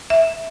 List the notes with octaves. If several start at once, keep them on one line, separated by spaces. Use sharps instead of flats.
E5